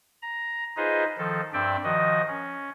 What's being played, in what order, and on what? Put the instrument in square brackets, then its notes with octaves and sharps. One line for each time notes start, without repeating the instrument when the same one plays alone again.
[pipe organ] A#5
D#4 F4 G#4 B4 C5 D#5
D#3 F3 A4
G2 C4 D5 E5 G5
D#3 F3 F#4 D#5
C#4